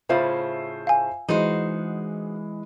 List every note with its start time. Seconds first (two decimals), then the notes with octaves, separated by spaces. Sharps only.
0.09 A2 C#3 F4 C5 E5
0.87 F5 G#5
1.28 E3 G#3 D#4 F#4 C5